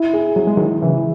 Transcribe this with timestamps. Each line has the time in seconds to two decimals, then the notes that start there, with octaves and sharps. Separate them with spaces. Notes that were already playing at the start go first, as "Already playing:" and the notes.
Already playing: E4
0.13 G#4
0.36 F#3 G#4
0.47 G#3
0.57 D#3 F#3 E4
0.82 C#3 E3 E4